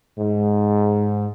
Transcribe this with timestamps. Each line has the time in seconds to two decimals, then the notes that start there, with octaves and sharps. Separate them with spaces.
0.18 G#2